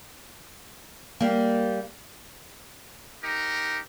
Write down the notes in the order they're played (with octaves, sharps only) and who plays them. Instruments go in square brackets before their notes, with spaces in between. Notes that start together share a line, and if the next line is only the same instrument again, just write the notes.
[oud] G3 A#3
[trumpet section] D#4 G4 A#4